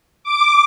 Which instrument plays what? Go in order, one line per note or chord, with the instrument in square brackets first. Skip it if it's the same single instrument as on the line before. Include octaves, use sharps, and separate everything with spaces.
[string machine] D6